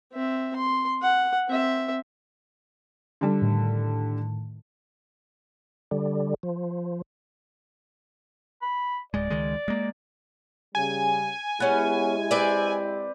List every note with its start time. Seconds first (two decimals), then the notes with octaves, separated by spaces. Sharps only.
0.12 C4 E5
0.56 C6
1.02 F#5
1.48 C4 E5
3.21 D3 G3
3.42 A2 D#3
5.91 D3 G3
6.43 F3
8.62 B5
9.14 D1 G#3 D5
9.30 C#2 D#3 G#3
9.68 G#3 A#3
10.75 C#3 G3 G#5
11.60 G#3 B3 C#4 E4 G4
12.31 C4 B4 D5